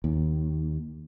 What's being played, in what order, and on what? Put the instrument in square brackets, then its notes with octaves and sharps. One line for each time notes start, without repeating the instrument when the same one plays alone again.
[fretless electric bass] D#2